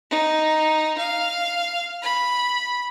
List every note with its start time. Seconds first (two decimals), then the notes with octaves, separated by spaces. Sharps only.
0.11 D#4
0.98 F5
2.02 B5